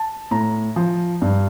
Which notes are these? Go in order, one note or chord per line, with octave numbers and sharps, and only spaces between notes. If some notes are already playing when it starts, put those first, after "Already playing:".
Already playing: A5
A2 A#5
F3
G2